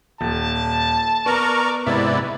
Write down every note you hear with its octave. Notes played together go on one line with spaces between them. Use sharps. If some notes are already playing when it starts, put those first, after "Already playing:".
D#1 A5
B3 A#4 D5 A#5 C#6
G#2 C3 B3 E4 D5 E5